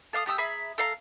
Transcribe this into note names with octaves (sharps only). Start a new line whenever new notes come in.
A4 F5 D6 D#6
A3 G4 D#6 E6
G#4 E5 A#5 B5
A4 F5 A#5